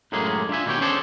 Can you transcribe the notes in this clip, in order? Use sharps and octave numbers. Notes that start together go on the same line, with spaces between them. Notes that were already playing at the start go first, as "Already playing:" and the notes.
F#2 A2 D#3 G#3 A#3 G#4
D4 F4 E5 G#5
D#2 B2 G3 F4 C#5 G5
C#4 D4 G#4 A4 C5 D5